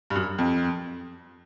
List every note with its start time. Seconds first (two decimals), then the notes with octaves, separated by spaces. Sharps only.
0.10 G2
0.15 F#2
0.39 F2